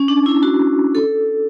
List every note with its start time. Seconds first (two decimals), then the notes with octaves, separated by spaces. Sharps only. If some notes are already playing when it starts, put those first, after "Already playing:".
Already playing: C#4
0.08 D4
0.26 E4
0.43 F#4
0.95 A4